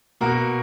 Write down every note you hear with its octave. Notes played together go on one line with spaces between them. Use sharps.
B2 A#3 F#4 A#4